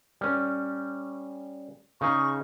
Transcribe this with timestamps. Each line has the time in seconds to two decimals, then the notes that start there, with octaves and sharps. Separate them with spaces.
0.21 G3 C#4
2.01 C#3 D#4 G#4 C#6